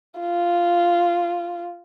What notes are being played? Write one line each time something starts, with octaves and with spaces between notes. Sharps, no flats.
F4